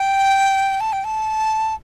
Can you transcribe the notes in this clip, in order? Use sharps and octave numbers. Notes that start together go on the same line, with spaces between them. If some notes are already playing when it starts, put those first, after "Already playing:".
Already playing: G5
A5
G5
A5